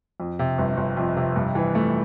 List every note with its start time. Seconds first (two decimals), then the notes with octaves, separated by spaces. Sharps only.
0.20 F2
0.39 C3
0.58 G1
0.77 G1
0.97 F2
1.16 C3
1.36 G2
1.55 E3
1.75 A3